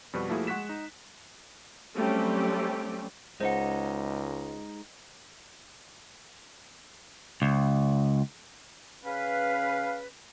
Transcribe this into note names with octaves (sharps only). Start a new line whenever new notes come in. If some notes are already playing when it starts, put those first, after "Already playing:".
F2 B2 G3 F#4 B4 C#6
F3 A3 A#3 E4 F#4 G#4
G#3 F#5 C#6 F#6 B6 E7
D#4
F#3 G3 A3 C4 C#4 G4
C#2 G#3 D#4 C5 D#5 F#5
C#2
C#3 C#4 B4 F5